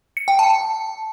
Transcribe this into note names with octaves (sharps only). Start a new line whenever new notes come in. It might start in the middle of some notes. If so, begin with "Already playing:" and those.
C#7
G5
A5